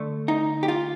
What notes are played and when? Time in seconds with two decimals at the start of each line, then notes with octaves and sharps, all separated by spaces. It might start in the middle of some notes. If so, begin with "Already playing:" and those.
Already playing: D3 A3
0.28 D#4
0.63 G4
0.68 F4